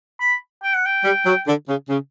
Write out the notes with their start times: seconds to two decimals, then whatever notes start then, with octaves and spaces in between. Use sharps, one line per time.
0.20 B5
0.63 G5
0.75 F#5
0.86 G5
1.04 G3
1.26 F#3
1.47 D3
1.68 C#3
1.89 C#3